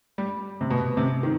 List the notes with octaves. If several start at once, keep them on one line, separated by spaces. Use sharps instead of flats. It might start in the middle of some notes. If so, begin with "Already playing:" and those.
G3
C3
B2
C3
D#3